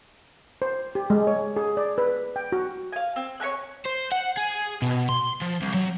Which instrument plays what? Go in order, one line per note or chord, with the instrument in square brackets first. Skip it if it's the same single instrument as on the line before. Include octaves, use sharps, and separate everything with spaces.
[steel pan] C5
G4
G#3
C#5
G#4
D5
B4
G5
F#4
[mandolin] F5 G#5
C4
C#5 E5 G#5 F#6
[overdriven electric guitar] C5
F#5
G#4
B2
C6
F3
C2
F#3